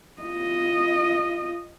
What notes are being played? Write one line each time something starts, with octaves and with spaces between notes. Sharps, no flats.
F4 D#5